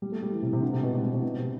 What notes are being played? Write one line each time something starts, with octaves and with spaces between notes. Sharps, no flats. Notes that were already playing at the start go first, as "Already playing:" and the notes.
G3
A3
G3
E3
C3
C3
D3
C3
B2
C3
B2
C3
B2
C3